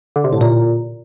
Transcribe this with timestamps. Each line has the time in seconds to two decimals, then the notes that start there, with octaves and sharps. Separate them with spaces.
0.16 D3
0.24 C3
0.33 A2
0.41 A#2